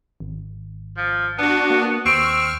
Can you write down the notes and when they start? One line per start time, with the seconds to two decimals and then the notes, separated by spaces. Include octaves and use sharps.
0.20 G#1
0.97 F3
1.38 B3 D4 F#4
1.70 A#3
2.05 D#2 C4 C#6 E6 F6